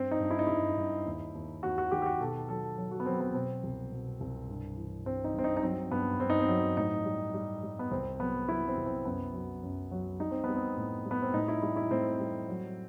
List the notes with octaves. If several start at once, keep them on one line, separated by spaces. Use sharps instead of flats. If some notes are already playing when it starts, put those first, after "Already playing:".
Already playing: G2 C4
D#4
G2
E4
D#4
G2 E4
G2
D#2
D#2
D#2 F#4
F#4
D#3 G4
G4
F#4
B2 A4
F#3 A4
F#3
F#4
B3
F#3 C4
B3
B2 C4
C2
B2
C2
G2
E3
G2 C4
D#4
G2 C4
D#4
D#4
F#3 C4
G2 B3
G2 C4
D#4
C4
F#3
A2 D#4
G3
G3
G3
B3
C2 C4
F#3 B3
F#3 E4
C4
C2
C4
F#2 B3
F#3
F#2
F#3
G3 D#4
C4
G3 B3
C4
A2
G3
B3
C4
A2 D#4
E4
G3 E4
E4
A2 C4
G3
F#3